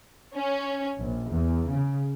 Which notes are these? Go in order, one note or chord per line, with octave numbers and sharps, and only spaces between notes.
C#4
A#1
E2
C#3